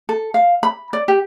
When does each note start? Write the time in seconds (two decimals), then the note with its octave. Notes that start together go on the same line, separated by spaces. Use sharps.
0.09 A4
0.34 F5
0.63 B5
0.93 D5
1.08 G4